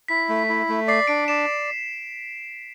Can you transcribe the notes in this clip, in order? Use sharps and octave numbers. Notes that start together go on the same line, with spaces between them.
E4 B6
A3
E4
A3
D5 C7
D4 D7
D5 E7